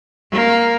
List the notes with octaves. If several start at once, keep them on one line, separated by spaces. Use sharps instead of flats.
A#3